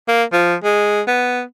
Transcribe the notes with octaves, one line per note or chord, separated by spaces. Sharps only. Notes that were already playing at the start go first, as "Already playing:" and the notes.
A#3
F3
G#3
B3